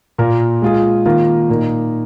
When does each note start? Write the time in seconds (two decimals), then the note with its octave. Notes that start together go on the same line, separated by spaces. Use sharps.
0.18 A#2 A#3 F4 A#4
0.62 G#3 F4 G#4
1.05 D#3 A#3 F4 A#4
1.50 A#2 A#3 D#4